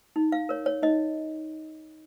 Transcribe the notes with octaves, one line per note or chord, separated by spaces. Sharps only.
D#4
F5
A#4 C#5
C#5
D#4 D#5